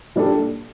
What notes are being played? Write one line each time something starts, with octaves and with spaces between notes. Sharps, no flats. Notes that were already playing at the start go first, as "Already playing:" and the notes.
A#2 G3 D4 A4